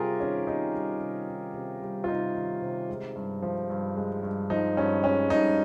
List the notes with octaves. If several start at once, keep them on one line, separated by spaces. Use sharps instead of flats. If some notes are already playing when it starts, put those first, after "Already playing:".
Already playing: C3 G3 F4 G4 G#4 A#4
D#3 C#4
C3 D#4
G3
C3
D#3
C3
G3
F4
C3 D#4
D#3
C3
G#3
G2
F3
G2
G#3
G2
F3 D#4
G2 C#4
G#3 C#4
G2 D#4